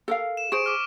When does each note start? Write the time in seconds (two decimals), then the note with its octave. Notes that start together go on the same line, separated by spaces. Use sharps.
0.08 A4 A#4 F5
0.37 E7
0.52 G#4 C5 C#6 D7
0.66 D6 F6